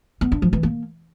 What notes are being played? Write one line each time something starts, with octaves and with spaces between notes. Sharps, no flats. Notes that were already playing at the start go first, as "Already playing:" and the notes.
B3
D4
F3
E3
A#3